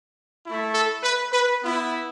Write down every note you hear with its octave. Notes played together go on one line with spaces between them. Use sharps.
A3 E4
A4
B4
B4
B3 E4